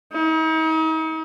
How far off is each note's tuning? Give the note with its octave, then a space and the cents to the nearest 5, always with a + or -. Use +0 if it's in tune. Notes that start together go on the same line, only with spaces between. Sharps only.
D#4 +40